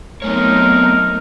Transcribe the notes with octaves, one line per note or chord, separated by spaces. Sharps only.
F#3 A3 B3 C4 D#4 A#4 C#5